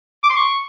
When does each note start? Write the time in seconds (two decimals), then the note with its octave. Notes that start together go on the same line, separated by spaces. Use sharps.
0.23 D6
0.30 C6
0.36 C#6